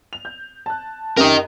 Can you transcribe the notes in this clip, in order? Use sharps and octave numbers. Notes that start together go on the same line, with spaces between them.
F7
G6
A5 F#6
F#2 G4 A#4 D#5